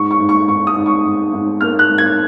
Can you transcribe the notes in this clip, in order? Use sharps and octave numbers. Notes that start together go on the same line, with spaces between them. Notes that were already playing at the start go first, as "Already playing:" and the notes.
Already playing: G#2 C#6
C#6
G#2
C#6
G#2 C#6
D#6
G#2
C#6
G#2
G#2
A#3 F6
F#6
G#2
G#6